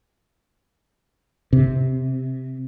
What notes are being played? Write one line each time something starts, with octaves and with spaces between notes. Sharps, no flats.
C3